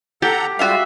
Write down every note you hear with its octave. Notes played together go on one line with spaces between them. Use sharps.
G4 A4 F#5 A#5
G3 G#3 F4 F#4 E5 F5